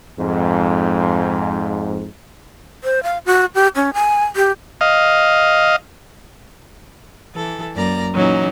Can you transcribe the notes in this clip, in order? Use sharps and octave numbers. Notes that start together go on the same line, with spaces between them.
F2 G#2
C5
F5
F#4
G4
C#4
G#5
G4
D#5 F5
E3 A4
F#2 A#3 D5 A#5
A#2 E3 F#3 C#4 D#4